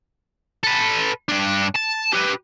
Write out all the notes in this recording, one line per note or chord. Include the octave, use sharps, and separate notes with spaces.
A4 B4
G2 D4
A5
G4 B4